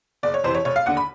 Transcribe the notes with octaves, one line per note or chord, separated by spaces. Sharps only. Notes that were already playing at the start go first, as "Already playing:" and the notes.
F#1 D5
C#5
F2 C3 E3 C5
C#5
F1 C#5
F5
D#2 D3 F#5
B5